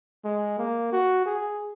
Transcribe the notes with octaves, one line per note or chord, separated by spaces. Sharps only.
G#3
A#3
F#4
G#4